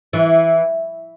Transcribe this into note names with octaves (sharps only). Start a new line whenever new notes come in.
E3